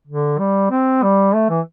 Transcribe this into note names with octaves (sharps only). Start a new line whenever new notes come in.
D3
G3
C4
G3
A3
E3